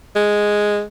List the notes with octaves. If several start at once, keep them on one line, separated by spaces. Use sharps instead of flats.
G#3